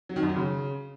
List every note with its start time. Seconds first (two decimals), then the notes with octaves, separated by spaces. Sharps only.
0.09 F#3
0.16 D#3
0.23 F#2
0.29 F#3
0.36 C#3